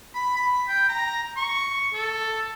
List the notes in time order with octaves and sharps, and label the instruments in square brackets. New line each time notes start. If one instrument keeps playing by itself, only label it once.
[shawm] B5
B5
G5
A#5
C#6
A4